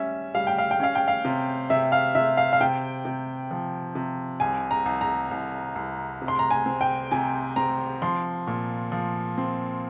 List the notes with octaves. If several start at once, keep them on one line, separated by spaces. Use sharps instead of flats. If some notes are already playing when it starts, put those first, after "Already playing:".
Already playing: G3 C#4 E5
G3 F5
G5
F5
G5
C#4 F5
G5
F5
C3
C3 E5
F5
C3 E5
F5
F5
C3 G5
C3
F3
C3
C2 G#5
A#5
C2
A#5
C2
C2
C3
C6
A#5
G#5
C4
G5
C3 G#5
C4 A#5
F3 C6
A#2
F3
C4